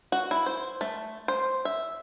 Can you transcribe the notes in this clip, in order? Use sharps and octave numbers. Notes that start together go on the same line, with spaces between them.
F#4
E4
C5
A3
C5
E5